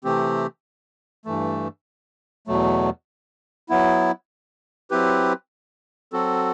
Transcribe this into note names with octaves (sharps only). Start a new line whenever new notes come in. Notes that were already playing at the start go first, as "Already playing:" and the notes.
C3 E3 A3 C4 G4
G2 E3 A3
E2 B2 F#3 A3
F#3 B3 E4
F#3 C4 E4 G4 B4
F#3 C4 F#4 A4